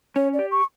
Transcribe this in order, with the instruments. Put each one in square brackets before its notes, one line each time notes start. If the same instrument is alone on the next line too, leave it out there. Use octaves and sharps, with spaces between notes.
[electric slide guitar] C#4 [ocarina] C#5
[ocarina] D5
[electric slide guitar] G4
[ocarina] C#6